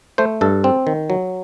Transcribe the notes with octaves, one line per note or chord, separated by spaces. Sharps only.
A3 C5
G2 A4
C4
D#3
F#3